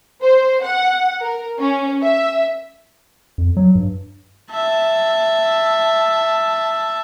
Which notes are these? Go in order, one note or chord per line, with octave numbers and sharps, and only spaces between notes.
C5
F#5
A#4
C#4
E5
F2
F#3
G2
E5 A5